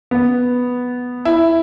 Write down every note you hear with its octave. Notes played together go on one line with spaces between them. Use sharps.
B3
E4